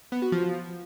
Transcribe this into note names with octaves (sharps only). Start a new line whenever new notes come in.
B3
F#4
F3